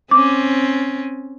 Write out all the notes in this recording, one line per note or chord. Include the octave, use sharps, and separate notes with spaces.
C4 C#4 D6